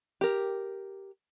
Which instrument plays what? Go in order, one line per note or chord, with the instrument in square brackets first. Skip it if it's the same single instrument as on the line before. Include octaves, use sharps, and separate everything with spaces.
[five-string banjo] G4 A#4